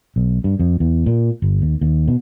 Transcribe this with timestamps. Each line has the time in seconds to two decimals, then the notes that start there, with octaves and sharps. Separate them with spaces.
0.16 B1
0.44 G2
0.59 F2
0.80 E2
1.06 A#2
1.42 G1
1.62 D#2
1.81 D#2
2.08 B2